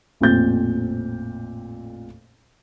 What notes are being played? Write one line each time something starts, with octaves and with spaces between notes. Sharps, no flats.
A1 F2 A#2 C4 G6 A6